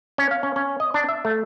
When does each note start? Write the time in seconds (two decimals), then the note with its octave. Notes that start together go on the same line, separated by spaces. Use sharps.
0.18 C#4
0.31 F5
0.43 C#4
0.56 C#4
0.80 D#5
0.94 D4
1.09 E5
1.25 A3